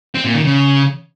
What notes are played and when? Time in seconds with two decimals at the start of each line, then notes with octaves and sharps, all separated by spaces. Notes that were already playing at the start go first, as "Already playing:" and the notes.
0.15 C4
0.25 A#2
0.35 D#3
0.45 C#3